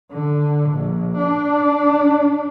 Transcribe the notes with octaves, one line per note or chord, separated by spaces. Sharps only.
D3
A#1
D4